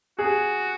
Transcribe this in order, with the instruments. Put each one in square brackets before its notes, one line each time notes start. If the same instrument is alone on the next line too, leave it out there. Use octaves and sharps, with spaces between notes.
[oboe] F#4 [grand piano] G#4